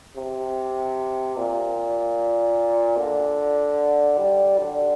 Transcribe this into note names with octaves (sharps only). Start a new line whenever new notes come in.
C3
A#2
D3
G3
D3